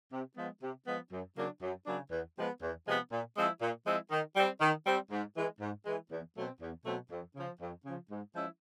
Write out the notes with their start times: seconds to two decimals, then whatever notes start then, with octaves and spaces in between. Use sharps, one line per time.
0.12 C3
0.37 F3 G#3 B3
0.62 C3
0.87 F3 G#3 B3
1.12 F#2
1.37 C#3 F#3 A#3 D4
1.62 F#2
1.87 C#3 F#3 A#3 D4
2.11 E2
2.37 C3 F3 G#3 B3
2.62 E2
2.86 C3 F3 G#3 B3
3.12 A#2
3.37 F3 G#3 C4 E4
3.62 A#2
3.87 F3 G#3 C4 E4
4.11 D#3
4.36 G3 C4
4.61 D#3
4.86 G3 C4
5.12 G#2
5.37 E3 G#3
5.61 G#2
5.86 E3 G#3
6.11 E2
6.37 B2 F#3 A3 C4
6.61 E2
6.86 B2 F#3 A3 C4
7.11 F2
7.36 C#3 F3
7.61 F2
7.86 C#3 F3
8.11 G#2
8.35 F3 G#3 C#4 E4